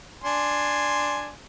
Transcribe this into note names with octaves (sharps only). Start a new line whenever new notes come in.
D4 G#5 C6